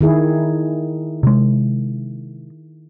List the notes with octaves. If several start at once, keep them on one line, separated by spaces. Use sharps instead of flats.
D#3 E4 G#4
C3 G#3